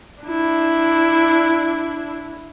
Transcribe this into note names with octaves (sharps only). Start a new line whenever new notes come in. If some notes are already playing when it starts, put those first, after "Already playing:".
D4 E4